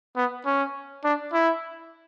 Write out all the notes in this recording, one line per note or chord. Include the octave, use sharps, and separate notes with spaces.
B3
C#4
D4
E4